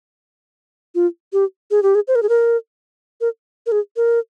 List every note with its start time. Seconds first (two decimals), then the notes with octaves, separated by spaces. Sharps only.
0.95 F4
1.33 G4
1.71 G#4
1.83 G4
1.95 G#4
2.08 C5
2.15 A#4
2.23 G#4
2.29 A#4
3.21 A#4
3.66 A#4
3.72 G#4
3.97 A#4